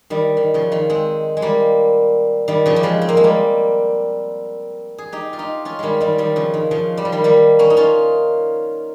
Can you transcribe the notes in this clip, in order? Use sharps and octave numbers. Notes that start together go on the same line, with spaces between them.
D#3 G3
D#3
C#3 F3
D#3
G#3 C4
G#3
G3 A#3
D#3 G3
C#3 F3
G3
F3 G#3
C4
A#3
G#3
G3 A#3
G#4
D#4 G4
F4
D#4 G4
C#4 F4
D#3 G3 G#3
D#3 G3
D#3 G3
C#3 F3
D#3
C#3 F3
G3
F3
D#3 G3
G3 A#3
A#3 C#4
D#4
C#4 F4